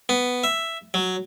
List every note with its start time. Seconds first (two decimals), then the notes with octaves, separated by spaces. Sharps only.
0.09 B3
0.44 E5
0.94 F#3